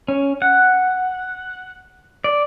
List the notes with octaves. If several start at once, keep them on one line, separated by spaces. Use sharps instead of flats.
C#4
F#5
D5